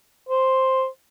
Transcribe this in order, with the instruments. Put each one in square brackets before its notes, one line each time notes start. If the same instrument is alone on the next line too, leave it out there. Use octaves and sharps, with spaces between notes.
[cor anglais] C5